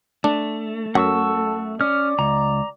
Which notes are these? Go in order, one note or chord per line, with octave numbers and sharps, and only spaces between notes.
A3 D4
F#2 A4 F#5 C#6 E6
C#4 D5 F6
C#2 A#5